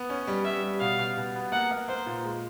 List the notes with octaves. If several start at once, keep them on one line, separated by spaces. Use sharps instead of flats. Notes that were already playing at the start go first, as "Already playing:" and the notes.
Already playing: B3
C#4
G3
G3 E5
G3
B2 F5
B2
B2
B3
A#3 F#5
A#3
A#3 C5
A#2
G#3